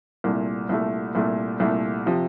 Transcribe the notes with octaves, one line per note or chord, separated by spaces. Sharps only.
C2 A#2 A3
C2 A#2 A3
C2 A#2 A3
C2 A#2 A3
C3 F3